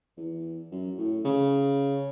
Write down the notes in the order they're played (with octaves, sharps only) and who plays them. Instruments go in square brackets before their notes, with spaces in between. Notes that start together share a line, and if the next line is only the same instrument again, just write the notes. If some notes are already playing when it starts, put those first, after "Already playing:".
[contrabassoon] E2
F#2
A2
C#3